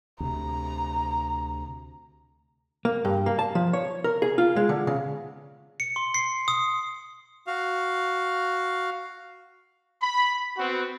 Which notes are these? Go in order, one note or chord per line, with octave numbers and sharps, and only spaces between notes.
D2 C3 A#5
A#3
G2
A#3
A5
F3
C#5
A#4
G#4
F4
G#3
D3
C#3
C#7
C6
C7
D#6
F#4 F5
B5
B3 C4 F#4